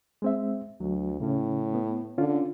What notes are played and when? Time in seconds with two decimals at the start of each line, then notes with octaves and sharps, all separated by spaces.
0.22 G#3 C4 E5
0.80 D2 F#3
1.20 A2 C#3 C#4
1.74 B3
2.18 D3 C#4 F4